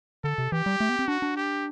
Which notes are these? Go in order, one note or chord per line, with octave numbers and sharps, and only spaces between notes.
D3 A4
C3
E3 G4
G3
A3
B3
C4
D4 F#4
D4
G4